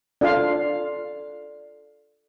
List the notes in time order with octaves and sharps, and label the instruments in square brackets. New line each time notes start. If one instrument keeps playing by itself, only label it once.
[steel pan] D4 F4 F5 [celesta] A4 D5